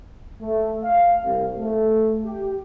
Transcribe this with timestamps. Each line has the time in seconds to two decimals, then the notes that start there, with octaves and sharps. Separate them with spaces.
0.41 A3
0.82 F5
1.23 C2
1.57 A3
2.24 G4